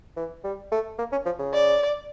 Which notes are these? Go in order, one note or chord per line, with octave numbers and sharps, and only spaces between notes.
E3
G3
A3
A#3
C#4
F3
C#3
D5